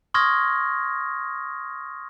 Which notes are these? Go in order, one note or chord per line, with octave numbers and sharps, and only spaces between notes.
C6 C#6 D#6 F6 G#6 A#6